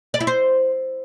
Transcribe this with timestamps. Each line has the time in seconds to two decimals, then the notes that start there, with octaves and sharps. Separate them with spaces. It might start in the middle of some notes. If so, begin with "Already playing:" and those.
0.14 D5
0.21 E4
0.27 C5